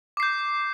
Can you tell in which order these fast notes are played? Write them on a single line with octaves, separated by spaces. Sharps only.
D6 C7 G6